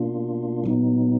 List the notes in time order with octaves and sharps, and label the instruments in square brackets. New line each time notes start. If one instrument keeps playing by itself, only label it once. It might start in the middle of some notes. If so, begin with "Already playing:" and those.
Already playing: [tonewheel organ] B2 A#3 D4 F4
A#2 F#3 B3 D#4